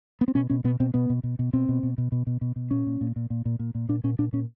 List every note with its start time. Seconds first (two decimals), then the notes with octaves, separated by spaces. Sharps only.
0.21 B3
0.28 C4
0.35 B2 C#4
0.50 B2 C#4
0.64 B2 B3
0.80 B2 C4
0.94 B2 B3
1.10 B2
1.23 B2
1.39 B2
1.53 B2 C4
1.69 B2
1.83 B2
1.98 B2
2.12 B2
2.27 B2
2.41 B2
2.56 B2
2.71 A#2 C#4
2.87 A#2
3.01 A#2
3.16 A#2
3.30 A#2
3.45 A#2
3.59 A#2
3.75 A#2
3.89 A#2 D4
4.04 A#2 C#4
4.19 A#2 D4
4.33 A#2 C#4